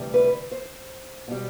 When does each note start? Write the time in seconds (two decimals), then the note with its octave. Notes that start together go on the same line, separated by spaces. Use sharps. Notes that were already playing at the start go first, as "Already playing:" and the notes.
Already playing: D2 C3 E3 G3
0.14 B4
0.51 C5
1.28 B2 G3